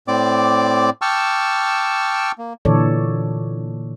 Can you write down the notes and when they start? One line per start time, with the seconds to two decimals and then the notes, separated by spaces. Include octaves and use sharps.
0.08 A2 C4 D5 D6
1.02 G5 A5 C#6 D6 E6 F6
2.38 A#3
2.65 A#2 D3 E3 A4 C#5 D5